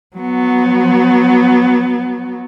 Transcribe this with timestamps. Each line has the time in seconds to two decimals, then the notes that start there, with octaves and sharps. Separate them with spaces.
0.16 F#3 B3